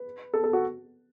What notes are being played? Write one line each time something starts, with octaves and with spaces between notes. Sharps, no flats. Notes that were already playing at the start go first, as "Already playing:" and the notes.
Already playing: B4
A4
A4
F#4